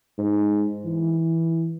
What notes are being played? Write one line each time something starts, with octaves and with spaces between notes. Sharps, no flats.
G#2
E3